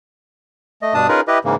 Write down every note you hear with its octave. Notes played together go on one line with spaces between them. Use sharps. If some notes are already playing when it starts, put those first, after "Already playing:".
A3 D#5
G2 B2 D4 A5 D#6
C#4 D#4 F4 G#4 A#4 B4
E4 G4 B4 D#5
G#2 C#3 E3 A#3